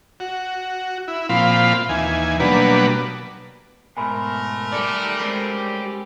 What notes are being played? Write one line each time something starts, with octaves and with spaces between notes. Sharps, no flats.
F#4
E4
A#2 F3 C4 F5 B5
D#2 E3 G#5
B2 F#3 G3 A#3 D4 B4
G#2 B2 A3 A#4 G#5 B5 C6
D#3 G4 A4 D5
G#3 C4 C#4